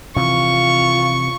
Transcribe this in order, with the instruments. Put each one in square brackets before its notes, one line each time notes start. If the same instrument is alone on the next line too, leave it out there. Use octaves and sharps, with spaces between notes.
[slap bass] C3 E3 F3 [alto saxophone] F4 [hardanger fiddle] C#6